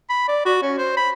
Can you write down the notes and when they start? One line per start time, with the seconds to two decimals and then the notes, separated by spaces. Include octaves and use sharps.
0.10 B5
0.28 D5
0.46 F#4
0.62 C#4
0.78 C5
0.97 B5